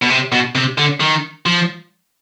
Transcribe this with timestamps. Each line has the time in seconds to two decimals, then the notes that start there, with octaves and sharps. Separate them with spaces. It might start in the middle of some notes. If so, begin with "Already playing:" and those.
0.02 B2
0.10 C3
0.32 B2
0.55 C3
0.78 D3
1.00 D#3
1.46 F3